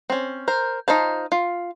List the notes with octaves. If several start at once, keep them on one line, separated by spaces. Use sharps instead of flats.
C4 C#4
A#4 C5
D#4 F4 C5 A5
F4